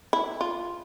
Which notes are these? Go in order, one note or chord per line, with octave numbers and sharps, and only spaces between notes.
E4
F4